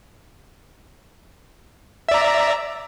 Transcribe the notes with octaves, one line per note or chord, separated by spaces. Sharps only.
D5 E5 A#5